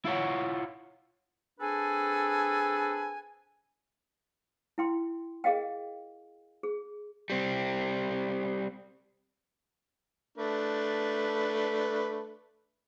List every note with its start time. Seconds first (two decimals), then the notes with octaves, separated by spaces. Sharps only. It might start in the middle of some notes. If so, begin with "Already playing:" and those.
0.05 E4 F4 C#5 F#5
1.60 C4 D4 G#4 A4 B4 G#5
4.78 E4 G5 C6
5.44 G#4 A#4 D#5 F5 G5
6.63 G#4
7.30 G3 C4
10.38 A3 D4 B4